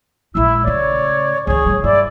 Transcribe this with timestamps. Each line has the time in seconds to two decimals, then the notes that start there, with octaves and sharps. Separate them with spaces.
0.35 A#1 G#3 E4 E6
0.64 A2 C#3 C#5 D5
1.47 C#2 D#3 G#4 C#5
1.66 C3 G3
1.84 G2 E4 D5